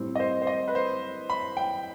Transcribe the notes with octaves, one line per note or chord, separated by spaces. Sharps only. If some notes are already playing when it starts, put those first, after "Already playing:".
Already playing: A2 G3 C4
D#5
C5
C5
D#5
B4
C5
B5
G5